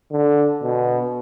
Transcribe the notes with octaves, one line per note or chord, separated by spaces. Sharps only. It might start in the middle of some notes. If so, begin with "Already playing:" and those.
D3
B2